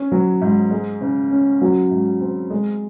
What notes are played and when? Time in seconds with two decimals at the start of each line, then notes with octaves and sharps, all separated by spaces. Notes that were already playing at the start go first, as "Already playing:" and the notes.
Already playing: C#4
0.12 F#3
0.41 G#2
0.71 G#3
1.01 C#3
1.31 C#4
1.62 F#3
1.91 G#2
2.21 C4
2.51 G#3